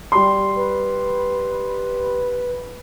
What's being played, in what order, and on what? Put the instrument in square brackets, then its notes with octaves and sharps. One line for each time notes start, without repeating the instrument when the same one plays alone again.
[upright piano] G3 C6
[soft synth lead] B4